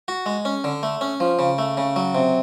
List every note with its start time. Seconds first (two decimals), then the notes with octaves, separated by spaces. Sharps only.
0.08 F#4
0.26 G#3
0.45 C#4
0.64 D3
0.83 A3
1.01 C#4
1.20 F3
1.39 C#3
1.58 A3
1.77 C#3
1.96 F#3
2.15 C3